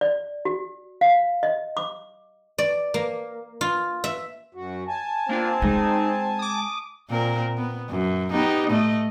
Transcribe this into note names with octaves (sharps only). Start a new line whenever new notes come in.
D5
F#4
F5
D#5
D6
D5
A#3
F4
E5
F#2 F#4
G#5 A5
A#3 C4 D4 F4
G#3 D#4
D6 D#6
A#2 C4 A#4
B3
F#2
B3 D#4 G4
A2 A3 D#5